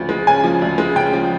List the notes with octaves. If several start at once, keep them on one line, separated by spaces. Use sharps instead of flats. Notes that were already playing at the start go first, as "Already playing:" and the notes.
Already playing: D2 C#3 F3
G#3
C#3 G#5
F3
D2
G#3
C#3 G5
F3